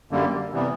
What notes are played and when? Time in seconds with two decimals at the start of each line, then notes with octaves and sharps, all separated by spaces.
0.11 F#2 D3 G3 A#3
0.52 C3 E3 G3 B3